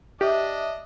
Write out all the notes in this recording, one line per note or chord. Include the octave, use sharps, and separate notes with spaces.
D4 G4 D#5 E5